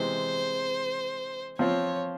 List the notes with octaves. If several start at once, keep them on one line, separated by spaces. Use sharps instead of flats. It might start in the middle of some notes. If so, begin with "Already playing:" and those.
Already playing: C3 E3 G#3 C5
F3 C4 F4 C5 C#5